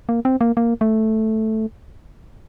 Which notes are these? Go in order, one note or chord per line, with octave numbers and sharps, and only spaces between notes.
A#3
C4
A#3
A#3
A3